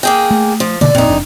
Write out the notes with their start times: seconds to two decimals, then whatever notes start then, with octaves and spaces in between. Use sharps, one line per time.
0.03 A#3 G#4 G5
0.31 A3
0.60 F3
0.81 B2 D3 A#3 D5
0.95 F1 F2 A#2 D#4
1.09 F#1 D4